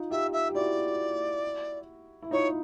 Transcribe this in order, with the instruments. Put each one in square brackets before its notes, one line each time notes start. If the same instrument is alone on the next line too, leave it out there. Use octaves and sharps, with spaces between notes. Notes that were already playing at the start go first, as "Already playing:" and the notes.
Already playing: [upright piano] D#4 F4
[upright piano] F4 G4 [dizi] E5
[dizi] E5
[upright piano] G4
[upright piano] E4 F#4 [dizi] D5
[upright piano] E4
[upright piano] D#4 F4 [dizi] C#5